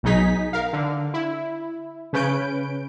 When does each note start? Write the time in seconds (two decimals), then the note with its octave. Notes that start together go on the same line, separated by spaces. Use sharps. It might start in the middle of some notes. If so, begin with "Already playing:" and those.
0.03 B1 B2 F#3 D#4 G#4 B6
0.53 A#4 F5
0.73 D3
1.14 E4
2.13 C#3 C#4 B4 G6 D7